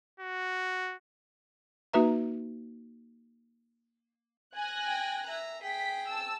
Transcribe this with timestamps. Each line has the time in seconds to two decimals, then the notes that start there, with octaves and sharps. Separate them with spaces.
0.20 F#4
1.93 A#3 D#4 F#4 B4 E5 A#5
4.56 G#5 F#6 A#6
4.86 G5
5.26 E5 A#5
5.62 G#4 G5 B6
6.07 A5 E6